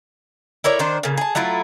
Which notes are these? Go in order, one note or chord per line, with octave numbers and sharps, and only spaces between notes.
E4 A#4 C#5 D5
D#3 D4 C5
A#2 C#3
G#4 A5
F#3 A3 E4 F4